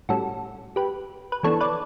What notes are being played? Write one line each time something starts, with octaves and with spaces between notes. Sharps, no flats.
A2 G3 C#4 F#4 A4
G4 B4
B4
E3 B3 D4 A4 C#5
B4 D5